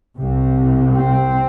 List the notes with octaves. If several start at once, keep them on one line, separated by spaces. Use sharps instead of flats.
C2 C3
C4